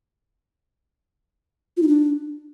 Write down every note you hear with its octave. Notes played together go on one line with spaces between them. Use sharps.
F4
D#4
D4